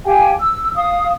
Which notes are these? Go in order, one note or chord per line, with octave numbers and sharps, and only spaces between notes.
G4 F5 G5 G#5
E6
F5 D#6